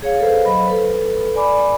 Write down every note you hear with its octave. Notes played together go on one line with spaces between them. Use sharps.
G#4 C#5 F5
A4 B4 C5 F5
F#3 D#5 B5
A4 B4
D5 G#5 B5 D6